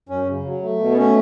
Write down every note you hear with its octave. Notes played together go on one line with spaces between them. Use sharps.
F#2 C#4
C#3
F#3
A3
B2
B3
A3 C#4